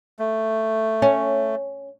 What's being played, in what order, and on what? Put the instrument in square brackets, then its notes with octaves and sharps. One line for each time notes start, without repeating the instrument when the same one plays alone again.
[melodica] A3
[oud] C#4